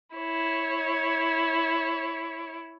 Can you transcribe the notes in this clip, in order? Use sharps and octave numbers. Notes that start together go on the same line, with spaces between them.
E4 C#5